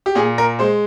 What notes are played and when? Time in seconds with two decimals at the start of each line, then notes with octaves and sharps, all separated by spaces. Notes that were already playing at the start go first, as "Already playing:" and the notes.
0.06 G4
0.15 A#2 G#4
0.38 A#4
0.59 G#3 C5